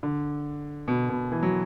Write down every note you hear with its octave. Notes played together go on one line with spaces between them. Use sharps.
D3
B2
B2
E3
F#3